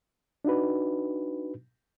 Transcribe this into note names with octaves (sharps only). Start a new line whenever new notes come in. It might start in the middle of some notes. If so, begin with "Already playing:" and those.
D4 D#4 F#4 B4